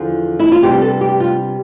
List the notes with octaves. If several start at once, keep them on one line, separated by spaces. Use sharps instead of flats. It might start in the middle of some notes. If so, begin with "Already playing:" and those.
Already playing: E2 D3 F3
E4
F4
C3 G3 B3 D4 G4
A4
G4
F4